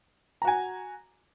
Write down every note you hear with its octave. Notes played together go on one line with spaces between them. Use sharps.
F#4 G#5 A#5